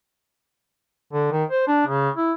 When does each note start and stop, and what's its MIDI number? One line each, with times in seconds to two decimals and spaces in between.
1.13 1.29 50
1.31 1.44 51
1.51 1.63 72
1.68 1.84 62
1.86 2.10 49
2.16 2.33 64